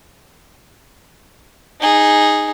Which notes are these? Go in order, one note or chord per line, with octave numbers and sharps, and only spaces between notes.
D#4 G#4